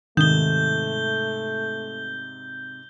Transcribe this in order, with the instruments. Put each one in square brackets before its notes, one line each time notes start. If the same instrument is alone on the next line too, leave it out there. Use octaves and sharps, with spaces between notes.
[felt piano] G#2 C3 [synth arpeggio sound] D#3 [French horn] A3 [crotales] G6 G7